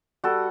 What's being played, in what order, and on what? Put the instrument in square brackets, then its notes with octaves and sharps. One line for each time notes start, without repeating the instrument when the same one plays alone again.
[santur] G3 F#4 A4